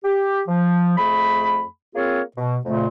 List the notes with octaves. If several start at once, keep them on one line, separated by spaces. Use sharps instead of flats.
G4
F3
F2 A3 G#4 B5
A#3 C4 F4 G#4 A#4 C#5
B2
F2 A#2 C#3 A3